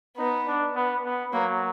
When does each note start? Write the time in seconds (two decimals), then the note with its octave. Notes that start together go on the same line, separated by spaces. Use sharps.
0.18 B3 D#4
0.47 D4
0.75 B3
1.04 B3
1.33 F#3 A#3